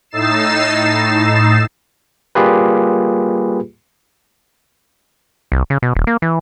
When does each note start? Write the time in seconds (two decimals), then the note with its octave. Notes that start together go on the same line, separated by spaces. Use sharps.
0.11 A2 D#4 E6 A6 C7 E7
2.35 G3 A#3 F4 G4 G#4 B4
5.52 C2
5.70 C#3
5.82 B2
5.95 D#1
6.07 A#3
6.22 E3